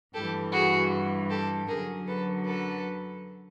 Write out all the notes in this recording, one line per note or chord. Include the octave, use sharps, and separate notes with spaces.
G2 E3 G3 G4 A4
F#4 G#4
G4 A4
F#2 D3 F#3 G#4 A#4
A4 B4
A4 B4